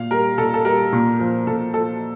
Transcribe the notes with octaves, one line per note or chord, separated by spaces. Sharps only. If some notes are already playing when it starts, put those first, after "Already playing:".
Already playing: A#2 F5
G3 A#4
A#2 A4
A4
G3 A#4
A#2
F3
A#2 A4
F3 A4